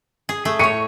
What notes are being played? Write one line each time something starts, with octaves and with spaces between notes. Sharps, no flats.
G#4
A3 G#4
A2 C#5 C#6 C#7 D#7